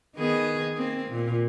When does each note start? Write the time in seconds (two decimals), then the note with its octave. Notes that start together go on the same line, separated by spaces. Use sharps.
0.15 D#3 B3 G#4
0.75 A#3 C4
1.09 A#2